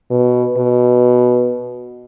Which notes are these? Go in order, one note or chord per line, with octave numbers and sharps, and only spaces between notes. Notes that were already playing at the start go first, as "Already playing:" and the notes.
B2
B2